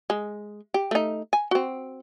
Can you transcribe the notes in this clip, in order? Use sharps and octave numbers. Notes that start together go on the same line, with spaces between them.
G#3
G4
A3 D#4
G#5
C4 F#4